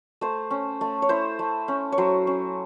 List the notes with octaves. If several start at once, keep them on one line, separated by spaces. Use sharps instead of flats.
A3 C5
C#4
A3
C#5
E4 C5
A3
C#4
C#5
F#3 C5
C#4